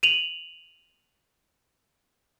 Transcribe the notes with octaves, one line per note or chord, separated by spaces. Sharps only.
D#7 F7 F#7